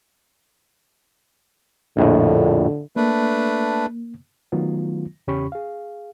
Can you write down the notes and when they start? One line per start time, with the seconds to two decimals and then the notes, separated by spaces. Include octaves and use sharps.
1.97 A#1 F2 A2 D3
2.96 A3 A#3 D4 B4
4.52 D#3 F#3 A3 B3 F4
5.27 E2 C#3 C#4 G4 B5 C#6
5.52 G#4 F5